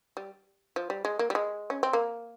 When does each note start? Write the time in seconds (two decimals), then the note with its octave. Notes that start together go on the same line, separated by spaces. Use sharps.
0.17 G3
0.76 F3
0.90 G3
1.05 G#3
1.19 A#3
1.30 G3
1.35 G#3
1.70 C#4
1.83 C4
1.93 A#3